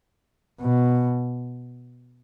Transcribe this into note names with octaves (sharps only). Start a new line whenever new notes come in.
B2